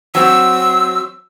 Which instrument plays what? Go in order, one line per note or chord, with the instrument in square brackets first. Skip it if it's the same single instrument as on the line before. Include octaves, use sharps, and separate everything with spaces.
[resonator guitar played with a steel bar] F#3 C4 [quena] E6